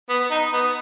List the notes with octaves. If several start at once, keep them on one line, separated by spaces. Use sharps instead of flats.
B3
D#4
B3